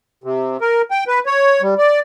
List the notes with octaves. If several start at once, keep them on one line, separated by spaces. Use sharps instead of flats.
C3
A#4
G5
B4
C#5
G3
D5